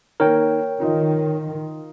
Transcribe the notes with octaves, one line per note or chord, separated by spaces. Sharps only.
D#3 A#3 A#4 C#5 G5
D#3 D#4 F4 D#5